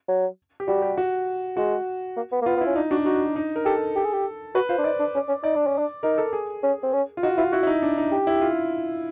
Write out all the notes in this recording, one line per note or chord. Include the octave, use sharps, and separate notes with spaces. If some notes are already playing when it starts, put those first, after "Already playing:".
F#3
G4
G3 F#4
G4
F#4
G#3 F#4
A#3
B3
A#3
B3 F4
B3
E4
C#4
D4 D#4
D4 F#4
D#4 F#4
D#4
A#4
G4 A4
G4
G#4
G4
F#4 B4
F4 C5
D4
D#4 D5
D4
C#4
C#4
D#4 D5
D4
C#4
D4
D#4 A#4
A4
G#4
C#4
C4
C#4
F4
D#4 F#4
E4 F4
E4 F#4
E4
D#4
D4
D#4
G4
E4
F4